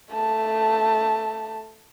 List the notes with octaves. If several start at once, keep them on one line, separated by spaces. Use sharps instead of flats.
A3 A5